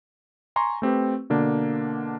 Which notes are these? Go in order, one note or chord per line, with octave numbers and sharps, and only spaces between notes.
G#5 A#5 C6 C#6
A3 C4 G4 B4
B2 D3 A#3 D4